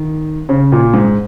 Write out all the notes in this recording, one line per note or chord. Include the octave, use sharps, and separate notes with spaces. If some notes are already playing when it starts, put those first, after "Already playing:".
Already playing: D#3
C#3
A#2
G#2